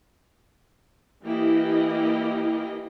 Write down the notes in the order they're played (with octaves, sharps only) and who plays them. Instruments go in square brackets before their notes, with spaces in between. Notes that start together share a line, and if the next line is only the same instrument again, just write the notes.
[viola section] E3 A#3 E4 G4 D#5